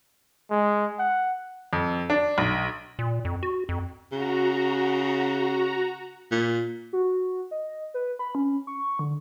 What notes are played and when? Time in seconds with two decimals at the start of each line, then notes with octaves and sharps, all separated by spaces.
0.50 G#3
0.99 F#5
1.73 F2
2.10 D4
2.38 B1
2.99 A#2
3.25 F2
3.43 F#4
3.69 F2
4.12 C#3 F#4 A#5
6.32 A#2
6.93 F#4
7.51 D#5
7.94 B4
8.19 B5
8.35 C#4
8.67 C#6
8.99 D3